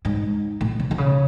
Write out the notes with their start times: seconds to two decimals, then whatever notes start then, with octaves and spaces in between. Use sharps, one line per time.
0.05 G#2
0.61 A2
0.80 C3
0.91 C3
0.98 C#3